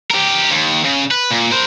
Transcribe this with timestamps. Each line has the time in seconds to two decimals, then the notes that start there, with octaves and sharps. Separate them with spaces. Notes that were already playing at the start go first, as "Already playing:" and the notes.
0.11 G4 A#4
0.51 D#2
0.85 C#3
1.11 B4
1.31 A#2
1.51 A#4 C5